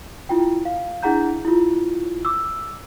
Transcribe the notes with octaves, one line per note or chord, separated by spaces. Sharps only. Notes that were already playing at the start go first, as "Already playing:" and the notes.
E4 F4 G5
F5
D4 E4 G#4 F#5 A#5 G6
E4 F4
D6 E6